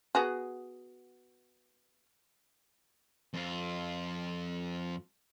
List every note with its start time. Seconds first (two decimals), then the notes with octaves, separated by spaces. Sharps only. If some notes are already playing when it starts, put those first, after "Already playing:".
0.15 B3 F#4 G#4
3.34 F2 F4